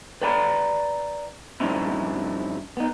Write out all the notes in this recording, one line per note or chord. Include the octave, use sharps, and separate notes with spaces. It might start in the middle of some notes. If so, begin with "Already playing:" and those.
B4 D5 G5 A#5 B5
G2 F3 C4 C#4 D#4 E4
B3 D#4